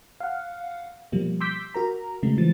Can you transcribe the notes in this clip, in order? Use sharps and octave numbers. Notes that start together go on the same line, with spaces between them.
F5 F#5
B2 F3 G3 A#3
C6 D6 E6 G6 B6
F#4 A#4 A#5
C#3 G#3 A3
E3 F3 A6